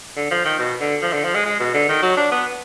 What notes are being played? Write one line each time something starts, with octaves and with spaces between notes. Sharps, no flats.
D3
F3
D#3
B2
D3
F3
D3
F3
G#3
G#3
B2
D3
D#3
F#3
D4
B3